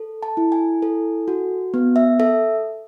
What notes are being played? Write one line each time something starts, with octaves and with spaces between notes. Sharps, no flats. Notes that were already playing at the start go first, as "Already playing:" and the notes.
Already playing: A4
A5
E4
G#5
A4
F#4
B3
E5
A4 E5